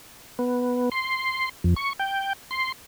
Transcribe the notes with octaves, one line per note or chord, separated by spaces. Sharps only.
B3
C6
F2
C#6
G5
C6